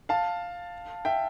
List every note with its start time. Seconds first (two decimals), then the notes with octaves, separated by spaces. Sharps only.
0.09 F5 A5
1.05 E5 G5